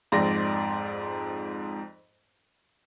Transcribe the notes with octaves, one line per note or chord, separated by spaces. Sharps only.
F2 G#2 D5 C6 A#6